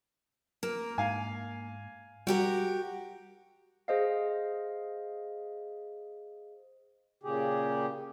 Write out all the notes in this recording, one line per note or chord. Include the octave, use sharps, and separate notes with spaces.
A#3 A#4
G#2 F5 G#5
G3 F#4 G4 A#4
G#4 C5 D#5 F5
A#2 C#3 G4 G#4